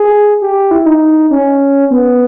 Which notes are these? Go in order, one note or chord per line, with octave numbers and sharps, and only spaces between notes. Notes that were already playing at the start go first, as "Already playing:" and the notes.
Already playing: G#4
G4
E4
D#4
C#4
B3